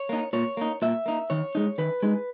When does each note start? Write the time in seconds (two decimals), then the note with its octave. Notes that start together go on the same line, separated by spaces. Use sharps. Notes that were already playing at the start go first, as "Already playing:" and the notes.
Already playing: C#5
0.09 A#3 D#4
0.33 A#2 C#5
0.57 A#3 D#4
0.82 A#2 E5
1.06 A#3 D#4
1.30 D#3 C#5
1.55 G#3 D#4
1.78 D#3 B4
2.03 G#3 D#4